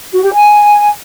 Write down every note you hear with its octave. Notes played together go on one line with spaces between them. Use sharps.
F#4
G4
G#5